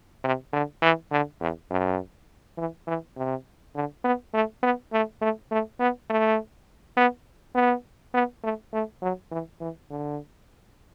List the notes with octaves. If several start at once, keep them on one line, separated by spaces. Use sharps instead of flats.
C3
D3
E3
D3
E2
F#2
E3
E3
C3
D3
B3
A3
B3
A3
A3
A3
B3
A3
B3
B3
B3
A3
A3
F#3
E3
E3
D3